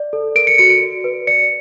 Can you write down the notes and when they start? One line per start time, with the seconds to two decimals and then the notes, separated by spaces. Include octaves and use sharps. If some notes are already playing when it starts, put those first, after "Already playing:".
Already playing: D5
0.13 A4
0.35 A#4 D7
0.47 C#7
0.58 F#4 C#7
0.70 D7
0.82 D5
1.04 B4
1.27 D5 C#7